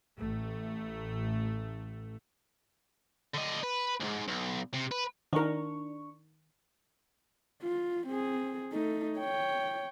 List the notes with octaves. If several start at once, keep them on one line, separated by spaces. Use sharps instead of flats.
A1 A3
D3 D#5
B4
D2 G#2
B1
C3
B4
D#3 D4 A#4 C#6
F4
C4 G#4
A3 D#4
C#5 G5